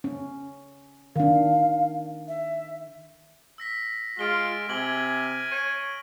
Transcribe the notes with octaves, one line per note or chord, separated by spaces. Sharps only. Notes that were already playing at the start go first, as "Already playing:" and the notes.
C#4
D#3 D4 F5
E5
E6 A#6 B6
G#3 F4 F6 D7 G7
C3 G#5 G#6 F#7 G7
C#5 D#7